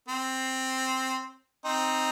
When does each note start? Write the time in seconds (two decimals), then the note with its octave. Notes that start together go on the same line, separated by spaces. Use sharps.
0.08 C4
1.65 C4 D#4